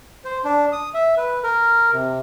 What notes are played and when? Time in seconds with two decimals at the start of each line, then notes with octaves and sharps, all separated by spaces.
0.25 C5
0.45 D4
0.72 D#6
0.94 E5
1.17 B4
1.43 A#4
1.92 C3